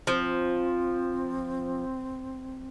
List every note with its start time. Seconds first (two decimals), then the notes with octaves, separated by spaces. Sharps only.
0.07 F3 C4